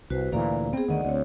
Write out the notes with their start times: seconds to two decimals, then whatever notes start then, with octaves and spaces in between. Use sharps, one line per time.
0.10 C2 F#4 B4 C5
0.32 D2 A#2 E3 D5 F5 A#5
0.73 B3 C4 G#4
0.88 D2 D#3 D5 D#5 F#5
1.05 D2 C4 C#5